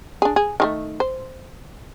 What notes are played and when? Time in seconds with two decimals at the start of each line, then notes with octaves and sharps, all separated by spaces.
0.22 D4 G#4
0.36 G#4
0.60 D#3 G#3 A3
1.00 C5